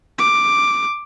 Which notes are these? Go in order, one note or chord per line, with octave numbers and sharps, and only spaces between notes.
D6